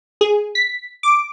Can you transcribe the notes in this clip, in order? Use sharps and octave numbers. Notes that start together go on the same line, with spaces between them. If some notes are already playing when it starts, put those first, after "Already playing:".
G#4
B6
D6